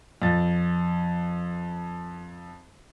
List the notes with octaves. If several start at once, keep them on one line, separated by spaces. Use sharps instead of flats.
F2 A6